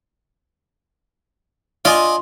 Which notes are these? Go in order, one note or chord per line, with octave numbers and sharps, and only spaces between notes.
F4 D5 D#5 G#5